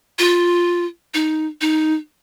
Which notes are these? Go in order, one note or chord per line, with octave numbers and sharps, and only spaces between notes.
F4
D#4
D#4